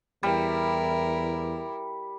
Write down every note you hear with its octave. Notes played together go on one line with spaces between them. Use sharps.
E2 G3 E4 A#4